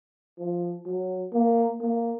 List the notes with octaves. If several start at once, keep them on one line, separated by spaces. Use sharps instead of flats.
F3
F#3
A#3
A#3